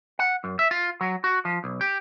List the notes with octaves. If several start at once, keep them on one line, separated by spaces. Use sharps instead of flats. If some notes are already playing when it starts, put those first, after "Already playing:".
F#5
F#2
E5
F4
F#3
F#4
F3
B1
G4